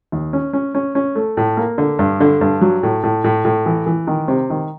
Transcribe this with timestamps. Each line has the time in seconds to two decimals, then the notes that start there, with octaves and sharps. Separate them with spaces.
0.12 D#2
0.33 C#4
0.53 C#4
0.75 C#4
0.95 C#4
1.15 A3
1.37 A2
1.57 A#3
1.78 D3
1.99 G2
2.20 D3
2.41 G2
2.61 F#3
2.83 A2
3.03 A2
3.24 A2
3.45 A2
3.66 E3
3.86 E3
4.07 D#3
4.28 C3
4.50 D#3